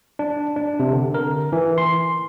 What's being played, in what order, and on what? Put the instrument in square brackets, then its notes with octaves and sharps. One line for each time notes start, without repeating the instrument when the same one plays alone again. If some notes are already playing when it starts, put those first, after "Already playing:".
[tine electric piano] D4
D4
C3
D3
A#4
E3
C6